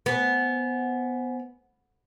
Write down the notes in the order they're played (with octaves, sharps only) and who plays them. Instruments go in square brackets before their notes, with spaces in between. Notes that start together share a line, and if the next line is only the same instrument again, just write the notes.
[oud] B3 [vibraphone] C5 F#5 G#5